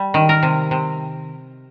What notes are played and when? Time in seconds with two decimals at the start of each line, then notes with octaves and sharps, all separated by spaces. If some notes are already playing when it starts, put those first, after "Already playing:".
Already playing: G3
0.14 D#3
0.29 A#4
0.43 C3
0.71 C3